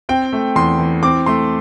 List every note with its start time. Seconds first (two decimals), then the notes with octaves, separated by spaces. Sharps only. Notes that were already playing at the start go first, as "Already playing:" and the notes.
0.09 C4 G5
0.33 A3
0.56 E2 C6
0.79 E3
1.03 C4 D6
1.26 A3 C6